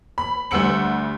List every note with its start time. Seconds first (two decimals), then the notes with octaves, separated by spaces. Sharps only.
0.18 B5
0.51 D2 G3 F#5 E6 C#7 F#7